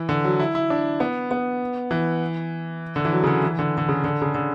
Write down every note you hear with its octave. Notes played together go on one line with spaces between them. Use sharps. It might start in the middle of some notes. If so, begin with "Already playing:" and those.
Already playing: E3
D3
F#3
E4
E4
D4
B3
B3
E3
D3
E3
F#3
C#3
D3
E3
D3
D3
C#3
D3
C#3
D3